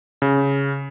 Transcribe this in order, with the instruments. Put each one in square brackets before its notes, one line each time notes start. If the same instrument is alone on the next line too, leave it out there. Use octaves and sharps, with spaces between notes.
[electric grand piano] C#3